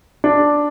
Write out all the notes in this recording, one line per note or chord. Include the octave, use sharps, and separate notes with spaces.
D4